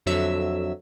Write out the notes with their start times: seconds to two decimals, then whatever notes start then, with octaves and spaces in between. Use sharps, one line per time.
0.06 F2 D3 F#3 E5 E6